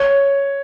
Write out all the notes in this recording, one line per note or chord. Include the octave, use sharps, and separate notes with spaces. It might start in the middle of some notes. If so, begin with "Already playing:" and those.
Already playing: C#5